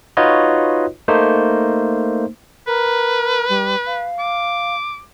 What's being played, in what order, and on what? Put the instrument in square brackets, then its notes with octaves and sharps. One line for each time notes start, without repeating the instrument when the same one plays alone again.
[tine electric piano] D#4 F4 F#4 B4 C#5 D#5
A3 A#3 D#4 C5
[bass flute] A#4 [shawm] B4
[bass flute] G3
F5
[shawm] D6